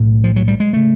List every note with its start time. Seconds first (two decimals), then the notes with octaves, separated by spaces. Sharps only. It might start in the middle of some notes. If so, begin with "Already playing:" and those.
Already playing: B1 A2
0.24 F3
0.36 F#3
0.48 G3
0.60 G#3
0.73 C#3 A3